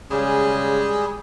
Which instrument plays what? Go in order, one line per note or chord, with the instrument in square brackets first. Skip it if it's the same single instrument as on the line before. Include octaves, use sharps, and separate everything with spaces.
[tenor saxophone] C#3 [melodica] G3 G#4 [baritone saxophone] G#3